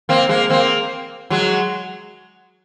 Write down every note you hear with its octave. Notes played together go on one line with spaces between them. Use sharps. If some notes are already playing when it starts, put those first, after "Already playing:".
A#3 C4
G#3 A#3
A#3 C4
F#3 G#3